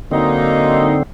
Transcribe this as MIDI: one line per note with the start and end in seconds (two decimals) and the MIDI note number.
0.11 1.03 50
0.11 0.94 54
0.11 0.94 58
0.11 1.03 60
0.11 0.94 63